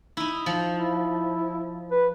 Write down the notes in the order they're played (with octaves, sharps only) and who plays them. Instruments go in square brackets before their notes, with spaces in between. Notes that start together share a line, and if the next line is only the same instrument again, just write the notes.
[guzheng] D#4 E4
F3
[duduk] E4
B4